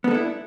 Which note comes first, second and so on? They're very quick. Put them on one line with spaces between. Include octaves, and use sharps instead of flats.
B3 A4 D4 E4